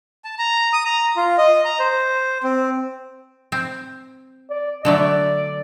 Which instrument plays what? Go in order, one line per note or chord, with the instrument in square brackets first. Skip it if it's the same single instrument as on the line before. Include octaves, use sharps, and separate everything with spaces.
[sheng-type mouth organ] A5
A#5
D#6
A#5
F4
D#5
A#5
C5
C4
[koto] C4
[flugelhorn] D5
[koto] D3 F#3 A3 [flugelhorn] D5